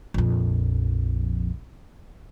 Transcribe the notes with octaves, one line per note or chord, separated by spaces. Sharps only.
A#1 F2